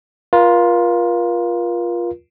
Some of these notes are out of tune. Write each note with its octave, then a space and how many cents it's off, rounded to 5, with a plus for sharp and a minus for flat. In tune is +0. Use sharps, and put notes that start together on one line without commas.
F4 +0 A#4 +40